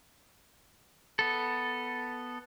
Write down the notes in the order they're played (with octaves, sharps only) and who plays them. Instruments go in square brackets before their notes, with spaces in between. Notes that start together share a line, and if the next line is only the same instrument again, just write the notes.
[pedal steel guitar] B3 A4